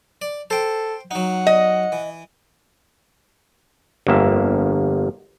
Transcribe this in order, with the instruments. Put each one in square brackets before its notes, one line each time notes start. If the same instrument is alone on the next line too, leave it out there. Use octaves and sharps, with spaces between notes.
[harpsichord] D5
[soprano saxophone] A4 [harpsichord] C5 G5
[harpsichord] F#3 D#4 [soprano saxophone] F#5
[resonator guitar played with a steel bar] D#5
[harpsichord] E3
[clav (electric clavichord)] G1 F2 A#3 E5